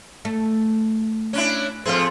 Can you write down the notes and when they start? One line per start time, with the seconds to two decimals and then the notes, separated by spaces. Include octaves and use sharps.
0.25 A3
1.33 C#4 D4 E4
1.86 F3 A3 C4 G#4 F5